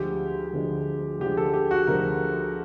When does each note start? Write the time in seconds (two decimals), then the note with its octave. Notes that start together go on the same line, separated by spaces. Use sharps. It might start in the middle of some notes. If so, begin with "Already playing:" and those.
Already playing: D2 D3 F3 G#3 G4
0.53 D2 D3 F3 G#3
1.20 D2 D3 F3 G#3 G4
1.37 A4
1.53 G4
1.71 F#4
1.87 D2 D3 F3 G#3 A#4